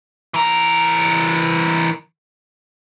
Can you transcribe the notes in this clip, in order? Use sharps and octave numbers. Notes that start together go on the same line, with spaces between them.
E3 A#4